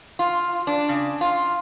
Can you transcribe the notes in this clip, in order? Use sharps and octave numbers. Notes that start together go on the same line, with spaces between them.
F4
D4
C#3
F4